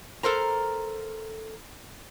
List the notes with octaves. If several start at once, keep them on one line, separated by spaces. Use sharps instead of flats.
A4 A#4 C5 A#5